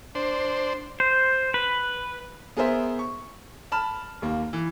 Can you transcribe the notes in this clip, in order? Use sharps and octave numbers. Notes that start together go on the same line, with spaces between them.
D4 C5
C5
B4
B3 G#4 A#4 C5 E5
C#6
A5 B5 F6 E7
D#2 A#3
E3